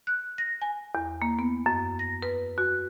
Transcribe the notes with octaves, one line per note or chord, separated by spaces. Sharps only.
F#6
A#6
G#5
E2
A#3
B3
F#2
A#6
B4
F#4